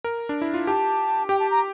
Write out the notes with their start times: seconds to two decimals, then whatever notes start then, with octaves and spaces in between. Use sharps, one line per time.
0.04 A#4
0.29 D4
0.42 E4
0.54 F4
0.67 G4 A5
1.29 G4 G5
1.40 A5
1.51 A#5